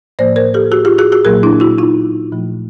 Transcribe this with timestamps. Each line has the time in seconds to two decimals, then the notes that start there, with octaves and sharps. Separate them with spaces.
0.19 A2 F3 A#3 C5 D5
0.36 A#4 C5
0.54 G4 A4
0.72 F#4 G#4
0.85 F4 G4
0.99 F#4 G#4
1.12 F#4 G#4
1.25 A#2 F#3 A#3 G#4 A#4
1.43 D4 E4
1.60 E4 F#4
1.78 D#4 F4
2.32 A#2 F3 A3